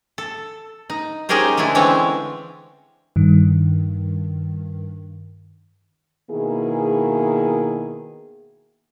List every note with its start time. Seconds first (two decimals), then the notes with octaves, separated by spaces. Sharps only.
0.18 A4
0.90 D#4
1.29 C#4 D#4 G4 G#4 A#4 C5
1.57 D3 G#3 A3 D4 E4
1.75 D3 E3 G#3 C4 C#4 C#5
3.16 G2 D#3
6.31 B2 D#3 A#3 E4 G#4